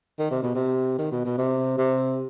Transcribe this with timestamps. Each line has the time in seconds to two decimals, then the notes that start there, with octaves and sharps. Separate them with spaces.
0.19 D#3
0.31 C3
0.43 B2
0.55 C3
0.98 D#3
1.12 B2
1.25 B2
1.38 C3
1.78 C3